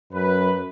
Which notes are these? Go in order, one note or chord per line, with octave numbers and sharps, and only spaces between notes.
F#2 B4